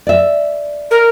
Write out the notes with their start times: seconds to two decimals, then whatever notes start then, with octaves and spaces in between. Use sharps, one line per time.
0.07 D5 E5
0.90 A#4